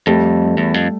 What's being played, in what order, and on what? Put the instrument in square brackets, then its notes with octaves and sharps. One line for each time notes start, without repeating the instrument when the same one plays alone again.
[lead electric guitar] F2 [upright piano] G3 A3
[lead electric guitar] E2
F2